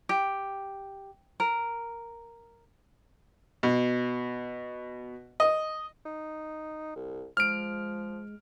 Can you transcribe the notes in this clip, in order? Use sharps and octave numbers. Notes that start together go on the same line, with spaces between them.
G4
A#4
B2
D#5
D#4
C2
F3 G#3 F6 D7